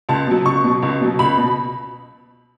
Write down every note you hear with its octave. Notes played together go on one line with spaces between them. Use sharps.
C#2 A5
B2 F#3
C#2 C#6
B2 F#3
C#2
B2 F#3
C#2 B5
B2